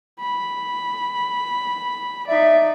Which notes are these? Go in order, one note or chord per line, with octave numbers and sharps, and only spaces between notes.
B5
D#4 D5 E5